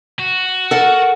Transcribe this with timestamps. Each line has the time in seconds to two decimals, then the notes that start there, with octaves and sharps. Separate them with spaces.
0.19 F#4
0.71 A4 A#4 F#5